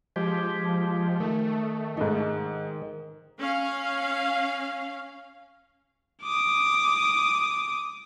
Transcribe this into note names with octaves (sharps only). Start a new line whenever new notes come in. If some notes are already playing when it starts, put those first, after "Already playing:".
F3 G#3 G4
D#3 A3
G#2 D#3 D#4
C#4 F5
D6 D#6